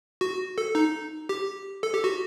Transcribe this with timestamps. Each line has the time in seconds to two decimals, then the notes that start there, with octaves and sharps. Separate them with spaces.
0.21 F#4
0.58 A4
0.75 D#4
1.29 G4
1.83 A4
1.94 G4
2.04 F#4